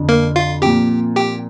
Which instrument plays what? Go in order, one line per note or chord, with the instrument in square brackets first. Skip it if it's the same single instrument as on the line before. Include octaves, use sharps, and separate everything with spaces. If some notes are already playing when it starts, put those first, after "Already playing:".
Already playing: [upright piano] F2 D3 D4
[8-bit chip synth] A#3 A#4
F4 F5
[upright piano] A#2 F3 C4 [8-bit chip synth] G4 G5
[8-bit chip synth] G4 G5